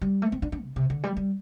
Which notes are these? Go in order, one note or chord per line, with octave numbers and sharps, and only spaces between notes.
G3
A3
C4
D4
D4
C3
C3
D3
G3
G3